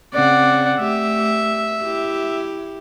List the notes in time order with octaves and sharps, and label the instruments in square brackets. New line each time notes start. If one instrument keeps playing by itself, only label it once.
[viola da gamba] C#3 C4 [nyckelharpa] D5 F#5
[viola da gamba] A3 G4 [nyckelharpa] E5
[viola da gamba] E4 G4